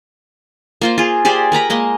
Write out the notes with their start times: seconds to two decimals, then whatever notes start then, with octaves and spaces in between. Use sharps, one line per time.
0.81 A#3 F4 C5
0.98 F4 G#4
1.25 G4 G#4 C5 D5
1.52 A#4 B4 A#5 B5
1.70 G#3 A#3 D#5